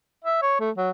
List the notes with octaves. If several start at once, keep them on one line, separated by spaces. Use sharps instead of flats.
E5
C#5
A3
F#3